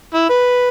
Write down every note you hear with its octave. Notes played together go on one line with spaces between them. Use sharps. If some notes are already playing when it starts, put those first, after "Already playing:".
E4
B4